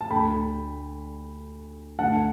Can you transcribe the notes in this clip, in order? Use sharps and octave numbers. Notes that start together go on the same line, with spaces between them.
A5
D2 D3 G5 B5
D3 F#5 A5
D2